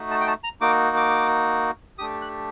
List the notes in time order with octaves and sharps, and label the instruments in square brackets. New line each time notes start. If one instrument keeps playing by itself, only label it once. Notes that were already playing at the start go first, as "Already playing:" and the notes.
Already playing: [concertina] A3 D#4 F#4
A5
G5
A5
A#5
A#3 D#4 F#4 D6
D6
A3 D4 G4 D#6
F#6